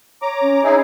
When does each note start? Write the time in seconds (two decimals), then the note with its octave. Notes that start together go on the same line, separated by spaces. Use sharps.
0.22 C#5 A#5 D6
0.42 C#4
0.63 D#4 E4 G#4